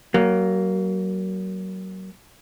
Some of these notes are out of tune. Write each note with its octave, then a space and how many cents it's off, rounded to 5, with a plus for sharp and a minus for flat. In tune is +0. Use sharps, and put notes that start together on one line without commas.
F#3 +30 A#3 +0